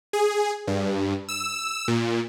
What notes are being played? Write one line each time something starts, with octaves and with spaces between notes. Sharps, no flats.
G#4
G2
E6
A#2